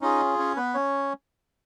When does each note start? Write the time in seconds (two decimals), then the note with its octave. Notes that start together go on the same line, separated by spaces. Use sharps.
0.01 C#4 D#4 F4 G#4 D#5
0.39 C#4 C#5
0.57 B3 B4
0.74 C#4 C#5